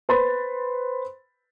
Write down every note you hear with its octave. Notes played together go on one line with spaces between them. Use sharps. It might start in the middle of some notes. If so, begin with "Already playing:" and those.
B4 C5 B5 C6 A6